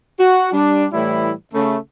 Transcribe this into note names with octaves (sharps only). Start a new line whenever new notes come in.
F#4
G3 D4
A2 E3 G3 A3 E4
C#3 A3